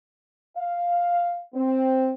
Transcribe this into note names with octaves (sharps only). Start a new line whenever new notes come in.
F5
C4